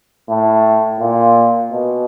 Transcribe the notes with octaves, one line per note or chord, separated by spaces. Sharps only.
A2
A#2
B2